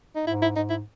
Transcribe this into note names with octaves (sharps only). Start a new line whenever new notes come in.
D#4
G#2 E4
E4
G#2 D#4
E4